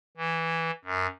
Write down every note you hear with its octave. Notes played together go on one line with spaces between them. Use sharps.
E3
F#2